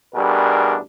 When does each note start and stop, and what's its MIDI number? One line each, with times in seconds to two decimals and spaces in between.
0.15 0.76 33
0.15 0.76 47
0.15 0.76 55
0.15 0.76 62
0.15 0.76 68
0.15 0.76 70